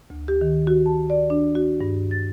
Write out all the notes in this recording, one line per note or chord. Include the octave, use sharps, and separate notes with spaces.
D2
G4
D#3
F#4
A5
D5
D4
F#4
G2
A6